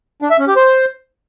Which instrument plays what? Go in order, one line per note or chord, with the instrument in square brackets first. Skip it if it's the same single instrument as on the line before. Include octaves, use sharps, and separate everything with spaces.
[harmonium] D4
E5
C#4
G4
C5